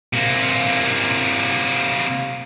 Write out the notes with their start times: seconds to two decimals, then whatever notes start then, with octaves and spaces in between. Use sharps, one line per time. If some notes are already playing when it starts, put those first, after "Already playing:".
0.13 C3 A#3